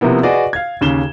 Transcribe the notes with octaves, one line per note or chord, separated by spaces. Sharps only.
C3 F3 A#3 B3 E4
F#4 G#4 B4 D5 D#5
F5 G#6
D#2 C#3 E7 G7